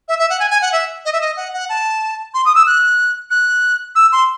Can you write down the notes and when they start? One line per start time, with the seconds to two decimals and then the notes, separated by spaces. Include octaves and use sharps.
0.08 E5
0.19 E5
0.30 F#5
0.40 G#5
0.50 G#5
0.62 F#5
0.72 E5
1.05 D#5
1.13 E5
1.21 D#5
1.37 F#5
1.54 F#5
1.69 A5
2.34 C6
2.45 D#6
2.55 E6
2.67 F#6
3.31 F#6
3.95 E6
4.12 C6